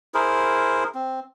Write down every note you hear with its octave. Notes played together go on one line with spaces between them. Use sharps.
E4 G#4 A#4 C5
C4